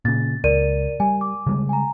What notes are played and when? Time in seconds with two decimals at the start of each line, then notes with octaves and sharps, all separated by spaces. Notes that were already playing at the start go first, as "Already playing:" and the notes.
0.05 A#2 C#3 A6
0.44 C#2 A#4 D5 D#7
1.00 G3 G#5
1.21 D6
1.47 C#3 G3 G#3
1.69 G#5 A#5